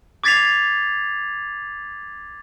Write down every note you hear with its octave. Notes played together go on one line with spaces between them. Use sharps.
D6 G#6 A6 B6 C7 F7